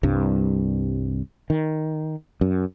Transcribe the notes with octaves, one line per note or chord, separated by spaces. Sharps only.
C2 G2
D#3
F#2